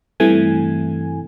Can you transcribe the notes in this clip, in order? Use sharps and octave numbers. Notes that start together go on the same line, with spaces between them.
G2 C3 E3 A3 G#5